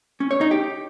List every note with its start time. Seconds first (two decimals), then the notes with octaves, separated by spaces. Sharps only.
0.20 C#4
0.31 C#5
0.41 D#4
0.51 G4